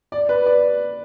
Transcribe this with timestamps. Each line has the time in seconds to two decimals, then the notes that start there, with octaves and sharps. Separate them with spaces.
0.12 D5
0.29 B4
0.46 D5